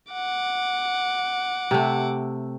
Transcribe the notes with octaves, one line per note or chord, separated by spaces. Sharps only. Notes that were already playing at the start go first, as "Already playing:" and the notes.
F#5 D6
C3 A3